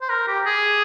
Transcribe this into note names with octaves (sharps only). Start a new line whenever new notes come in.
C5
A#4
G4
G#4